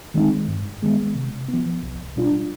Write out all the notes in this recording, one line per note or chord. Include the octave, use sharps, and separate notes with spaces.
D#3 G#3 C4 D#4
G2
D#3 G#3 B3
C3
B3
F3
C2
B2 G3 D4 F4